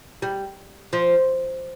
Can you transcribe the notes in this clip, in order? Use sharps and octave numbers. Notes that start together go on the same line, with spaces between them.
G3
F3